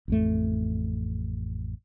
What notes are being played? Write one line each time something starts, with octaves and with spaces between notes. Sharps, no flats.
A1 F2 A3